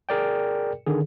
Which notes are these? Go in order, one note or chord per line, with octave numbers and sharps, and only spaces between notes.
G#4 A#4 D5 G5
D3 D#3 G#4